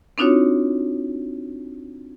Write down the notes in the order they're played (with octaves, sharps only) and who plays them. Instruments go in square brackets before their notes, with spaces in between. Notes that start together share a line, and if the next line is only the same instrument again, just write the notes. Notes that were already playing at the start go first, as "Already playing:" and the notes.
[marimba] C4 D4 D#4 F4 F#4 C#5